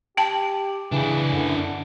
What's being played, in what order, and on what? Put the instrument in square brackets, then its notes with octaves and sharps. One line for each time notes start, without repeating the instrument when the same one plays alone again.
[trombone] G4 [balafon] G5 A5
[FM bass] C#3 [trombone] E3 [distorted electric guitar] D4 E4
[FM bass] F#2 [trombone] D3